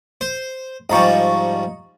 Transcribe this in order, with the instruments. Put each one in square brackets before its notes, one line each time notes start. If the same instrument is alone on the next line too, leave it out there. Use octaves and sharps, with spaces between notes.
[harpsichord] C5
[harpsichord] G#2 F3 G3 [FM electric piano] D#5 A#5 C#6